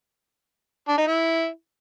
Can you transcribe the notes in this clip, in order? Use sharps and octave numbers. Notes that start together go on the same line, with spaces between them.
D4
D#4
E4